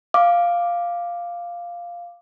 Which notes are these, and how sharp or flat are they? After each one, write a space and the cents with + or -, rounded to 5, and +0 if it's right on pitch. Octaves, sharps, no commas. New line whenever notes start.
F5 +0 D6 +5